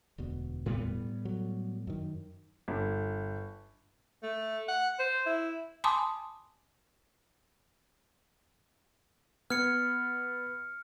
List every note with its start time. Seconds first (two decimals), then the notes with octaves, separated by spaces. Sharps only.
0.18 E1 D2 B2
0.66 A2 G3 B3
1.25 F#3
1.87 F#2 D#3
2.68 G1
4.23 A3
4.68 F#5
4.99 C5
5.26 E4
5.84 G#5 A5 B5 C6 D6 D#6
9.50 B3 F6 G#6 C#7